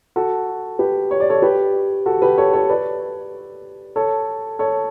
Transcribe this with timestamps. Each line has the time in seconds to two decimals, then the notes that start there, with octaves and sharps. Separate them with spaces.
0.16 F#4 A4
0.79 G4 B4
1.11 C#5
1.20 D5
1.30 A4 C#5
1.42 G4 B4
2.06 F#4 A4
2.22 G4 B4
2.38 A4 C#5
2.53 A4 C#5
2.69 B4 D5
3.96 A4 C#5
4.59 A4 C#5